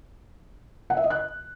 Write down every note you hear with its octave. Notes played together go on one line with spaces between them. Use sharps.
F#5
E5
D#5
F#6